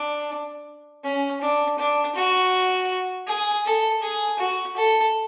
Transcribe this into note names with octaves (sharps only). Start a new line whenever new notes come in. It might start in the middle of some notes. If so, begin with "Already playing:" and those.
Already playing: D4
C#4
D4
D4
F#4
G#4
A4
G#4
F#4
A4